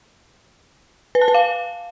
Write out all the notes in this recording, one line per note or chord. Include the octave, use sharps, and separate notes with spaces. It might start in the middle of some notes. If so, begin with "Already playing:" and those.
B4
A5
B4
F5